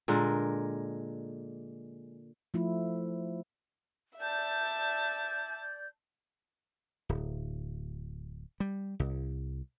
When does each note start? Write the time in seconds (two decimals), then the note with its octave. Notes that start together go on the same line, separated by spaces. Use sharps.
0.08 A#2 D3 G#3 A#4
2.54 F3 A3 E4 F4
4.19 D5 E5 A5 G6
7.09 D1
8.60 G3
9.00 C2